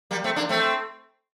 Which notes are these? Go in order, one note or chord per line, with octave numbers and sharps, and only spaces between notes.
G3 A#3
A3 C4
A#3 D4
A3 C4